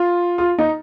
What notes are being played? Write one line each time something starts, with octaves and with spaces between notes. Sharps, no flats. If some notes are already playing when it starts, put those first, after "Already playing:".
Already playing: F4
F4
D#4